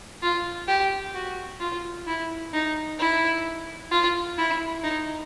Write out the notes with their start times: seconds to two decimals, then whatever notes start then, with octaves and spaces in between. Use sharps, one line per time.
0.23 F4
0.68 G4
1.14 F#4
1.60 F4
2.07 E4
2.53 D#4
2.99 E4
3.91 F4
4.38 E4
4.83 D#4